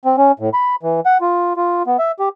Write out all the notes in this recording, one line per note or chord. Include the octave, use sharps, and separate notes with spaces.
C4
C#4
A2
B5
E3
F#5
F4
F4
B3
E5
G4